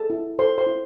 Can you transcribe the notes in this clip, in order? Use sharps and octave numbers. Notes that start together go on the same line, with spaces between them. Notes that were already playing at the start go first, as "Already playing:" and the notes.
Already playing: G#4 A4 A5
E4
A4 C5 C6
C5 C6
E4